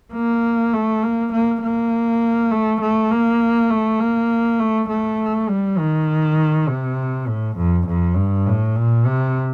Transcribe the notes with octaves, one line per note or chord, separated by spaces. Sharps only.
A#3
A3
A#3
A#3
A#3
A3
A3
A#3
A3
A#3
A3
A3
G3
D#3
C3
A2
F2
F2
G2
A2
A#2
C3